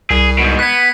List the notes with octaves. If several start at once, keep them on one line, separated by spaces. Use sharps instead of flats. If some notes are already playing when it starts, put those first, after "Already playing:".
C2 G#4
G#2 B2
B3 F#6 G#6